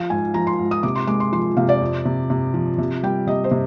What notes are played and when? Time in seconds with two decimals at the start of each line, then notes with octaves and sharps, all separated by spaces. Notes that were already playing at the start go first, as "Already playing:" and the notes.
Already playing: F3 F5
0.10 G#2 G#5
0.34 F3 A#5
0.47 C6
0.59 G#2
0.71 D#6
0.83 C3 D6
0.95 C6
1.07 G#3 D6
1.20 C6
1.32 F3 C6
1.57 C3 F5
1.69 D5
1.81 F2
2.05 C3
2.30 C3
2.54 F3
2.78 C3
3.03 G3 G5
3.27 C3 D#5
3.44 C5
3.51 C3